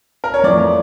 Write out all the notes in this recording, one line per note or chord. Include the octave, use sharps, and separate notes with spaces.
A#4
C#5
F2 E3 A3 D5